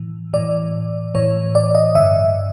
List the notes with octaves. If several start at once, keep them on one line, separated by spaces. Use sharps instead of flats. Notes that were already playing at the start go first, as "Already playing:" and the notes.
Already playing: A2 E3
A2 E3 D5
A2 E3 C#5
D5
D#5
G2 D3 E5